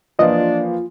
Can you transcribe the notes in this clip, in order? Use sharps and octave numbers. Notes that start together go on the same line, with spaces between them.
E3 F3 A#3 D4 F4 D#5